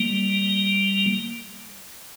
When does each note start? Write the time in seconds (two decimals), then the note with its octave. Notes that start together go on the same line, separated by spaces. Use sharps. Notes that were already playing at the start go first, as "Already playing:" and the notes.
Already playing: G3 A#3